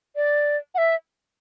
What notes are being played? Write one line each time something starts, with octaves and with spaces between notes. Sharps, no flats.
D5
F#5
E5